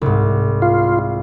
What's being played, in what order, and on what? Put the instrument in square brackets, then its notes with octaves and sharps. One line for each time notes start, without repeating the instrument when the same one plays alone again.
[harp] C2 G#2
[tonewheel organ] F4